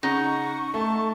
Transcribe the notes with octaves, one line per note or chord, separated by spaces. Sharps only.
C#3 D#4 F#5 C#6
A3 A5